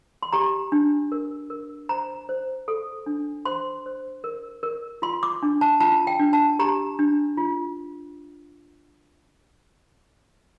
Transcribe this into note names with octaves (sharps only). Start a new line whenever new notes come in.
C6
G4 A#5
D4
A#4
A#4
C5 A#5
C5
A4
D4
C5 C6
C5
A#4
A#4
F4 C6
D6
D4
A5
F4 A5
G5
D4
A5
G4 A#5
D4
F4